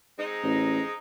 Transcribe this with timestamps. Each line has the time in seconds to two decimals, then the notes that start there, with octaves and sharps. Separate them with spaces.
0.18 G#3 C4 D#4
0.43 A1